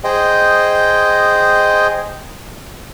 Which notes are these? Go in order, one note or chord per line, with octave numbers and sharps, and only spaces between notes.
G#4 C5 D#5 G5